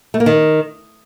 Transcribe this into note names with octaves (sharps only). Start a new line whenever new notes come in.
A3
A#3
D#3